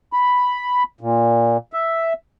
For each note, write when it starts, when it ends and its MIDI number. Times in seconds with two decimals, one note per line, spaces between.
0.13 0.83 83
1.01 1.57 46
1.73 2.13 76